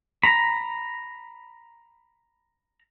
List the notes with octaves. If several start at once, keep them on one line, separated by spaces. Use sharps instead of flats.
A#5 B5